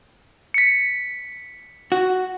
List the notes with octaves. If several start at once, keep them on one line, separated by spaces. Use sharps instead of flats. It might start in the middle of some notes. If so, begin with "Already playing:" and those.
B6 C#7
F#4